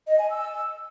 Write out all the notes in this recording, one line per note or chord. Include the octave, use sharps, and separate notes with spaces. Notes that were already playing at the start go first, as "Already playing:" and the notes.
D#5
G#5
E6